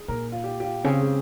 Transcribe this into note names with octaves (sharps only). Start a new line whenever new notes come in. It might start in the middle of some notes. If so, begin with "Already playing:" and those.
Already playing: G#4
A#2 A#4
F4
G4
G4
F4
C#3 C4
G#3